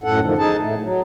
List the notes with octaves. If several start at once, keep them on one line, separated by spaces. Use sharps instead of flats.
F#2 A2 A4 F#5
D3 D#3 F3
D#4 G#4 A5
A2 A3
F#3